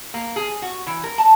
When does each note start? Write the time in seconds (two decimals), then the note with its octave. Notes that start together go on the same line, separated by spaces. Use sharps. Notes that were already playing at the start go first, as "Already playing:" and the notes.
0.14 A#3
0.36 G#4
0.62 F#4
0.87 E3
1.04 A#4
1.18 A5